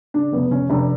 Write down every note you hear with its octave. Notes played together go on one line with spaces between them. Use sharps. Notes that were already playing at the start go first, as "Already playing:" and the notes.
C#3 D4
F1 B3
F1 C#4
F1 D4